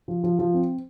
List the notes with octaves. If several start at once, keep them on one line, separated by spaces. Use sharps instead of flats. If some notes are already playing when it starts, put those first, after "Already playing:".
F3
F3
F3
C4